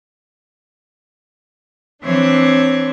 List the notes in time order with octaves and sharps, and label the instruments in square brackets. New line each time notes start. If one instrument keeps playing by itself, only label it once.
[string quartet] E3 C4 D4 C5 C#5